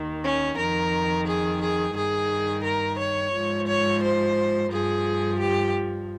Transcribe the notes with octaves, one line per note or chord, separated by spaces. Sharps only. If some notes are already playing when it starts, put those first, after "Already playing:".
Already playing: D#2 D#3
C#4
F2 D#3 A#4
G#4
G#4
G2 D#3 G#4
A#4
C#5
G#2 F3
C#5
C5
G2 F3 G#4
G4